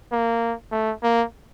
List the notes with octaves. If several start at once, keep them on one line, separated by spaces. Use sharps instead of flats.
A#3
A3
A#3